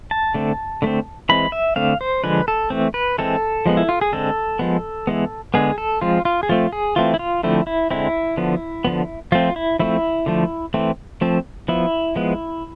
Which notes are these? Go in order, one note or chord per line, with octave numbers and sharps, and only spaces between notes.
A5
D3 A3 C4
D3 A3 C4
E3 G#3 C4 B5
E5
D3 A3 C4 F5
C5
D3 F3 G#3 B4
A4
E3 A3 C4
B4
E3 G#3 C4 A4
F3 G#3 B3
E4
F4
G#4
D3 G#3 C4 A4
F3 G#3 B3
E3 G#3 B3
D3 G#3 B3 G#4
A4
F3 G#3 C4 F4
F4
G#4
F3 A3 C4 F4
G#4
E3 A3 C4 F4
E4
F4
D3 F3 A3 C4 E4
E4
D3 G#3 C4 E4
D3 F3 B3
D3 F3 B3
F3 A3 C4 F4
E4
F3 A3 C4 E4
D3 F3 A3
E3 A3 C4
F3 A3 C4
F3 B3 E4
F3 G#3 B3